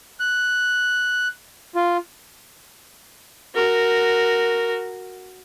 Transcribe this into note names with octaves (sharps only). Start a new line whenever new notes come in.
F#6
F4
F#4 A#4